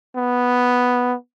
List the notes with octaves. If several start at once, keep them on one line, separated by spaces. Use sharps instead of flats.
B3